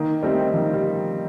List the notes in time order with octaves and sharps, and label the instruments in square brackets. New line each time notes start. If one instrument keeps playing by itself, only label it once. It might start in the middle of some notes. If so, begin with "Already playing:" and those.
Already playing: [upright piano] D#3 [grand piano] A#3
[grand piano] G3 [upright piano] A3 C4 D#4
[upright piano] D#3 [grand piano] F3
[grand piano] G3